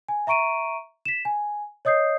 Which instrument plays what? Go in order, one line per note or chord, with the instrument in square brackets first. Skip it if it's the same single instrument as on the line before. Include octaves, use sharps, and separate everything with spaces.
[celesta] G#5
E5 A#5 C#6 D7 D#7
B6 E7
G#5
C#5 D#5 D#6 G6 C7